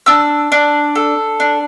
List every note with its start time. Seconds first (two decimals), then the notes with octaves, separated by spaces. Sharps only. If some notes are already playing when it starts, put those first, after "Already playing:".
0.06 D4 E6
0.52 D4
0.95 A4
1.40 D4